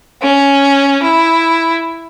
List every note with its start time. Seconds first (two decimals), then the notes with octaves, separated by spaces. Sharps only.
0.22 C#4
1.03 E4